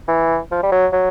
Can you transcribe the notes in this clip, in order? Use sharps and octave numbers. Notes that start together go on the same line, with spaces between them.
E3
F3
G3
F#3
F#3